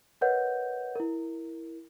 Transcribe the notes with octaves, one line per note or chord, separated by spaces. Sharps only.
A#4 B4 C#5 D#5 F#5 G6
E4 A#4